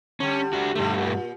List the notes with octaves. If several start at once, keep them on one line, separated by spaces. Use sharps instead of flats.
D3 G3 C#4
D4 F#4
G2 D3 G3 A3
A#2